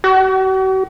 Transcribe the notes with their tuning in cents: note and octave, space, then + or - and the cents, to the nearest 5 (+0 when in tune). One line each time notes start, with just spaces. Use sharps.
F#4 +45